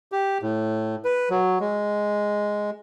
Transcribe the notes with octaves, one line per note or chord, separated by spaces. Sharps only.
G4
A2
B4
F#3
G#3